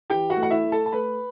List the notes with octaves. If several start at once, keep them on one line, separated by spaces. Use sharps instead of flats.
E3 G4 G5
F#4 F#5
A3
F#5
E4 E5
A3
A4 A5
A5
A3 B4 B5